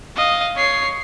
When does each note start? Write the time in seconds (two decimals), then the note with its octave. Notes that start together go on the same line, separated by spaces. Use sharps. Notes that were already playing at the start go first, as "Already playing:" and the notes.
0.16 D#5 F5
0.56 C#5 C7